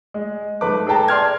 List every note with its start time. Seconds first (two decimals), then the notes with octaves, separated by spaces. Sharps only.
0.14 G#3
0.61 G#2 A3 B4 D6
0.87 G#4 A4 B4 G5 A5 A#5
1.08 D5 C6 F6 G#6